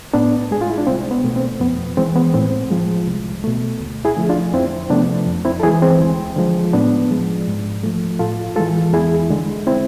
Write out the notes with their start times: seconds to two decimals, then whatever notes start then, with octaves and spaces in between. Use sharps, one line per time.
0.14 A2 B3 D4
0.51 G#3 G#4
0.61 F4
0.70 E4
0.78 D4
0.87 C2 C4
1.11 B3
1.24 B2 A3
1.36 C4
1.60 F2 B3
1.97 E3 G#3 C4
2.16 B3
2.34 A2 C4
2.70 F3 G#3
3.07 C2
3.44 B2 A3
3.80 D2
4.05 E4 G#4
4.16 D3 F3 A3
4.29 D4 F4
4.53 F2 C4 E4
4.90 C3 F3 A3 B3 D4
5.27 F2
5.45 C4 E4
5.60 A4
5.63 E3 G#3 E4 G#4
5.82 C4
6.01 D2
6.36 D3 F3 G#3
6.73 A2 B3 D4
7.11 F3 G#3
7.47 G#2
7.83 F3 A3
8.19 A2 F4 A4
8.56 E3 G#3 F4 A4
8.93 E2 E4 G#4
9.30 D3 G#3
9.67 C4 E4